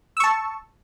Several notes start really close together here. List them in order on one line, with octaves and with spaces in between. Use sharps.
E6 C#6 A5